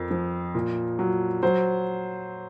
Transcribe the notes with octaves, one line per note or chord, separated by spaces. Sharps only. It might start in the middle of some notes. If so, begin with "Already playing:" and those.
Already playing: F2 F3 A#4
F3
A#2
F#3
F#3 C5